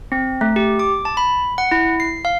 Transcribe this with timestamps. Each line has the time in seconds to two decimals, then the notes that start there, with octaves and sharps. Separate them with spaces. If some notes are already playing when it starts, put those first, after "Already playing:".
0.12 C4
0.41 A3
0.56 G4
0.79 D6
1.05 A5
1.17 B5
1.58 F#5
1.71 E4
2.00 C7
2.25 F5